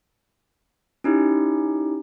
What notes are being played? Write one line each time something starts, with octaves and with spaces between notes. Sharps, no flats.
C#4 D#4 E4 G4